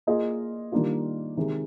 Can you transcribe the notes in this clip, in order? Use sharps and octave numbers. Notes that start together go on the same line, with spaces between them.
A#3 F4 G#4 D#5
D#3 G3 A#3 D4 F4
C3 D#3 G#3